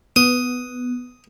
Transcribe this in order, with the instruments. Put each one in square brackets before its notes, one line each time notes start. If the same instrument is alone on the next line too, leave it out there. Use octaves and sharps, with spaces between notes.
[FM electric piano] B3 [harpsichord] D#6